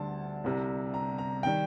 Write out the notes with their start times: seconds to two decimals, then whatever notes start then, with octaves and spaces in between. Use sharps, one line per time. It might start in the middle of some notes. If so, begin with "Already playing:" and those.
Already playing: D2 D3 G3 A5
0.44 C2 C3 G3
0.94 A#5
1.18 A#5
1.43 D#3 G3 G5